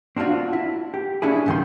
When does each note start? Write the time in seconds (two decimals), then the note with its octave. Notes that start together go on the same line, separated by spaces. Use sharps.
0.16 C4 D4 D#4 F4 F#4
0.53 E4
0.94 G4
1.22 C#4 D4 E4 G#4
1.46 C#2 G#2 D#3 G3 D#4 C6